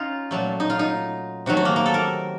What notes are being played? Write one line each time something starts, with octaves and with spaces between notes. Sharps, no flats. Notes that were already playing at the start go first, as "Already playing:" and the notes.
Already playing: C#4 D#4 F4
A#2 F#3 A3
D#4
F4
D#4
C3 D#3 F#3 A3 F#4
F#4
A#3
A#3
A4
A#4